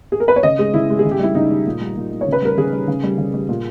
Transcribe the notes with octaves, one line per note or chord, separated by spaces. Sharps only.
G#4
A#4
B4
C#5
C#3 D#5
G#3 G#4
C#3 E4
G#3
G#4
C#3
G4
G3 E4
C#3 D#4
G3
A#2
G3
A#2
G3
C#5
C#3
B4
G3 A#4
C#3 G#4
G3
C#3
G3
C#3
G3
A#2